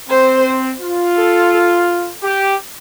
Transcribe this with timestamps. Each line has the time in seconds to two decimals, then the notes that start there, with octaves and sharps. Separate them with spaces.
0.09 C4 C5
0.81 F4
1.16 A4
2.23 G4